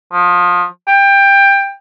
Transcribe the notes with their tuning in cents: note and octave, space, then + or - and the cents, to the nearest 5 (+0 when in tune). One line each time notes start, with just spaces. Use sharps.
F3 +25
G5 +20